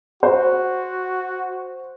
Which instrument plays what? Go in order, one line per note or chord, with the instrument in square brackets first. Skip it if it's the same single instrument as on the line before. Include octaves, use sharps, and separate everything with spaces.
[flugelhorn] F#4 [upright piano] C5